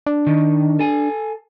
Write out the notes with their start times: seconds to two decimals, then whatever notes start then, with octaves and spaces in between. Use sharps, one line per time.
0.07 D4
0.27 D#3
0.79 A4 G#5